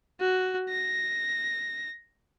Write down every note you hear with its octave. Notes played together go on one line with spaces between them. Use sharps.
F#4
A#6